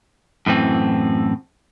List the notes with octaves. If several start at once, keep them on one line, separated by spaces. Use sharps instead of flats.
F#2 A2 E3 C4